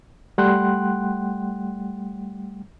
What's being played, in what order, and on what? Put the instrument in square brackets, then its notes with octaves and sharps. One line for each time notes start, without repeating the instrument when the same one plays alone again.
[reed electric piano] G3 A3 F#5 G5 C6 F#6